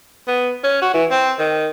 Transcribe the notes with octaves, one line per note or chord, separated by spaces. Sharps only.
B3
C#4
F#4
E3
C4
D#3